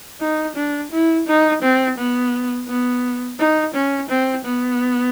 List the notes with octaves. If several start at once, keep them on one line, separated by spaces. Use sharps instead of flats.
D#4
D4
E4
D#4
C4
B3
B3
D#4
C#4
C4
B3